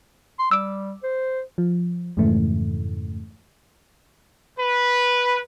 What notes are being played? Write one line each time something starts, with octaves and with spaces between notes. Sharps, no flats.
C6
G3 D6 E6
C5
F3
F2 G#2 C#3 E3 A3
B4